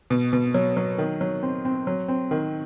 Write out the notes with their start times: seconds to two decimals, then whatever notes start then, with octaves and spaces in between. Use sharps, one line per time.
0.10 B2
0.33 B2
0.54 F#3
0.77 F#3
0.98 D#3
1.21 F#3
1.43 C4
1.65 C4
1.87 F#3
2.08 C4
2.31 D#3